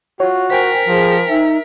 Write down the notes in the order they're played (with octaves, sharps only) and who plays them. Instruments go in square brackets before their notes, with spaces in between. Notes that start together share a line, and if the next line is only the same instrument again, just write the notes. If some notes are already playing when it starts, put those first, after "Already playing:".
[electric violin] F4 [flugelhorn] F#4 [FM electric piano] C#5
[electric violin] A#4 B6 [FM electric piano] C5 G5 G#5
[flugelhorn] F3 [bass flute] G#4
[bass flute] D#4 [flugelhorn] E5